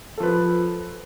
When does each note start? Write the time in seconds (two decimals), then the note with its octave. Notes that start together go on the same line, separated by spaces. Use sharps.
0.18 A4
0.20 F3
0.23 B4